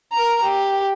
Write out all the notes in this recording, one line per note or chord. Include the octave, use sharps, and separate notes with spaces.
A#4 A#5
G4